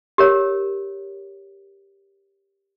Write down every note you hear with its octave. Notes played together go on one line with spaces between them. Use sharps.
G4 A#4 C#5